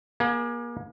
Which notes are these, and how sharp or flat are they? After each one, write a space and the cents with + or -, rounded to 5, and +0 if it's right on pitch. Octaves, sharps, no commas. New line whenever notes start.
A#3 +35 G#4 +0